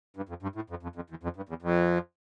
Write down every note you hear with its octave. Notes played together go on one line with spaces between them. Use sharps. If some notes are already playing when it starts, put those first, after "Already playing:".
G2
F2
G2
A2
F2
F2
F2
E2
F2
G2
E2
F2